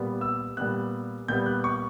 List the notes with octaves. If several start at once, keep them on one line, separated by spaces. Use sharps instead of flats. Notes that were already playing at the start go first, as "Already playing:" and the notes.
Already playing: A#2 G3 B3
E6
A#2 G3 B3 F#6
A#2 G3 B3 G6
F#6
C#6